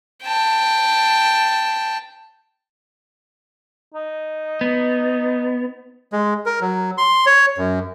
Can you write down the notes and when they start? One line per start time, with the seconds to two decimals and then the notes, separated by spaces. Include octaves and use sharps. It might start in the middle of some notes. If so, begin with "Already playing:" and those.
0.23 G5 A5
3.94 D#4
4.61 B3
6.12 G#3
6.46 A#4
6.61 F#3
6.98 C6
7.26 C#5
7.58 F#2